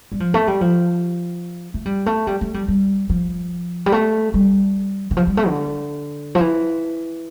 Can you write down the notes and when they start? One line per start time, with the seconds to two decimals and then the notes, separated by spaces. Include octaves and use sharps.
0.12 G3
0.20 F3
0.34 A3
0.48 G3
0.61 F3
1.74 A3
1.86 G3
2.06 A3
2.27 G3
2.41 A3
2.54 G3
2.68 G3
3.09 F3
3.86 G3
3.92 A3
4.34 G3
5.11 E3
5.17 F3
5.27 G3
5.37 A3
5.48 D3
6.35 F3
6.40 E3